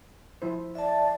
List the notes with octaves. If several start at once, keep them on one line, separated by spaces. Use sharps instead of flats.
F3 E4 C5
D5 E5 A5